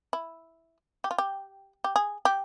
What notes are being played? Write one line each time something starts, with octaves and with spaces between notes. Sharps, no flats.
E4
G4
F4
G4
G4
G#4
G4